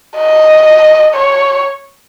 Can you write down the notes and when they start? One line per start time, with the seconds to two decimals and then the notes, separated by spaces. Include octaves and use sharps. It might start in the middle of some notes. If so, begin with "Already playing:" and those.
0.17 D#5
1.15 C#5